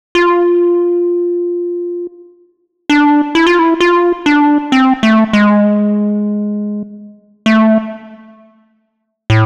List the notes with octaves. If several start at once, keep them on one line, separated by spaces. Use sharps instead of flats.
F4
D4
E4
F4
E4
F4
D4
C4
A3
G#3
A3
A2